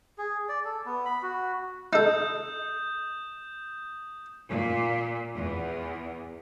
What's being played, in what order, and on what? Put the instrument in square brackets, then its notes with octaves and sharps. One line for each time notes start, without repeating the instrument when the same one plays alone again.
[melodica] G#4
D5
A4
B3
B5
F#4
[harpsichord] D#4 A4 [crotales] D#6 G6 E7
[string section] A#2
E2